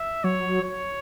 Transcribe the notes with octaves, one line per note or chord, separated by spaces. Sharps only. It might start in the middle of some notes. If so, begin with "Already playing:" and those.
Already playing: E5
F#3 C#5
C#5